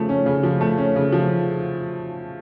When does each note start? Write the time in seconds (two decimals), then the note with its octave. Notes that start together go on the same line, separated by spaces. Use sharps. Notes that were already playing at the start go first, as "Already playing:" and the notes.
Already playing: C#3 F3 A3
0.09 C#4
0.26 C#3
0.43 F3
0.61 A3
0.78 C#4
0.96 C#3
1.12 F3